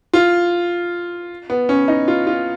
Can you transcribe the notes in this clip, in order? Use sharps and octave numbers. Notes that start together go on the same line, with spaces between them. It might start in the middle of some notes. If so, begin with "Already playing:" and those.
F4
B3
C#4
D#4
F4
F4